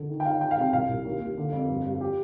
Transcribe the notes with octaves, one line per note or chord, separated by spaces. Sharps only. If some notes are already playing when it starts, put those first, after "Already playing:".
Already playing: D3
D#3
G5
D#3 F5
D#3 G5
F5
C3 G5
C2 F5
C2
D#2
D#2
D3
F2
G2
G2
G4